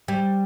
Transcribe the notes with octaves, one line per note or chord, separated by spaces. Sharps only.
G3